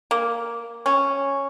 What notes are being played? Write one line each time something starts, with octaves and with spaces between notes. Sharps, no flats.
A#3
C#4